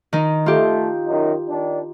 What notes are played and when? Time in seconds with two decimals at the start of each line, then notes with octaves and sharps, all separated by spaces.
0.13 D#3 D#4
0.46 A3 F4 G4
1.08 F#2 D#3 D#4
1.48 D#3 D4